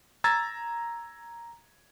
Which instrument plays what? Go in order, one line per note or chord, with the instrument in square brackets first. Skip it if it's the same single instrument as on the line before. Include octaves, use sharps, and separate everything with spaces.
[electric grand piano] A#5 E6 G#6 A6